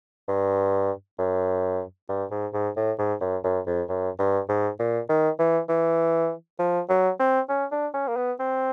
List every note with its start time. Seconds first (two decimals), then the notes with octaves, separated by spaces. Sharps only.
0.28 G2
1.19 F#2
2.09 G2
2.31 G#2
2.53 G#2
2.76 A2
2.99 G#2
3.21 F#2
3.44 F#2
3.67 F2
3.89 F#2
4.19 G2
4.49 G#2
4.79 A#2
5.09 D#3
5.39 E3
5.69 E3
6.59 F3
6.89 F#3
7.20 C4
7.49 C#4
7.72 D4
7.94 C#4
8.08 A#3
8.17 B3
8.40 C4